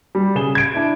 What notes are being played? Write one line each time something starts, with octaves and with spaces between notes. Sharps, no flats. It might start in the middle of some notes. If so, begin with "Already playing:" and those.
G3
C#3 G#4 E7 G7
G#6 D7
D4 E4